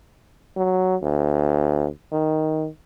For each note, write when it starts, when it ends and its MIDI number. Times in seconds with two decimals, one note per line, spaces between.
0.57 0.95 54
1.02 1.87 38
2.12 2.67 51